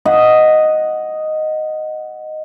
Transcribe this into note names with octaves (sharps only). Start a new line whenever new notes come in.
D#5 F#5